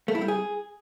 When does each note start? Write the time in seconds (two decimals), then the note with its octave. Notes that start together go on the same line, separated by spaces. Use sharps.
0.08 A3
0.15 E4
0.22 G3
0.28 G#4